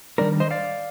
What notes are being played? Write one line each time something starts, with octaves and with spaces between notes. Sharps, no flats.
D#3 G3 D4 A#4 D5
C5 D#5
D5 F5